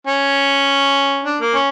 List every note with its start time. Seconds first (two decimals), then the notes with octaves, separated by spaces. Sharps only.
0.07 C#4
1.24 D4
1.40 A#3
1.55 C#4